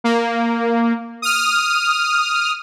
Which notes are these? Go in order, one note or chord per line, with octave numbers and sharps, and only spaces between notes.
A#3
D#6 F6